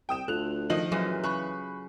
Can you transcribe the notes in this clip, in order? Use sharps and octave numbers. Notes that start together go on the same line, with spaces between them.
C2 G5 D#6 E7
D2 F4 A4 F#6 F7
D#3 F3 D#5 F#7
F#2 A#2 E3 F#3 G#3
C#3 B5 C#6 F#6